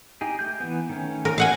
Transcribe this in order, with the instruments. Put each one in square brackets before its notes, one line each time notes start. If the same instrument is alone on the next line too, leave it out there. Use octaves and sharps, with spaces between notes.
[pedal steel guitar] D#4 G4 G#4
A3 G6
E3 B3
D#3 A3 C#4
[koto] A#4
F5 F#5 G#5